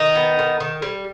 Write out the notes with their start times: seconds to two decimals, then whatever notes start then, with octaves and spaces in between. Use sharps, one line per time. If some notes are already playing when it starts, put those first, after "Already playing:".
Already playing: D#3 D#4
0.15 B3
0.39 D#3
0.60 D#3
0.82 G3